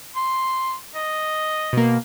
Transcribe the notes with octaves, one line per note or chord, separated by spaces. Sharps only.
C6
D#5
B2 A#3